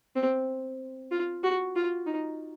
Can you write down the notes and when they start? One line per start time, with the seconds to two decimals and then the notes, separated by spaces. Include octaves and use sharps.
0.16 C4
1.11 F4
1.43 F#4
1.76 F4
2.06 D#4